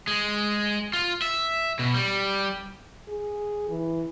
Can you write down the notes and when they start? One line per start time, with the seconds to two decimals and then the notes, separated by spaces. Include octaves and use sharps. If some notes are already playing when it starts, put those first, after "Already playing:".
0.08 G#3
0.93 F4
1.22 E5
1.79 B2
1.94 G3
3.09 G#4
3.69 E3